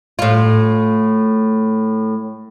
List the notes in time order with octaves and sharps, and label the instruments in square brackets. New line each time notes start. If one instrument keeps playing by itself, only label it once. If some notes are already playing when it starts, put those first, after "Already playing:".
[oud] A2 F4